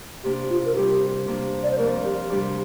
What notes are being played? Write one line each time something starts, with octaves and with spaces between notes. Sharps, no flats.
C3 A#3 D4 G4
F4
A#4
C3 G3 C4 G4
C3 A#3 D4
D5
C5
F2 F3 A#3 D4 A#4
G4
C3 G3 D4 G4